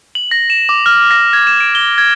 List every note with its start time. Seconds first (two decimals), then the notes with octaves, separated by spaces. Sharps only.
0.15 F#7
0.31 A#6
0.50 E7
0.69 D6
0.86 F6
1.11 A#6
1.33 G#6
1.47 E7
1.60 D7
1.75 G7
1.98 G#6